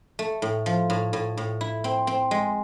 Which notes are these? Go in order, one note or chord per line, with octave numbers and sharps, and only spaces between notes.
A3
A2
F3
A2
A2
A2
E4
C4
C4
G#3